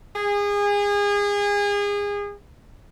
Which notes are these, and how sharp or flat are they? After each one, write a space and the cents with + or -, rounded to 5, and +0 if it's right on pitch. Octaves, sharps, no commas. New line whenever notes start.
G#4 -30